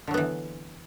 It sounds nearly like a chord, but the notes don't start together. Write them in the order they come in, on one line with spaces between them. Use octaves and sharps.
D3 F#3 B3 E3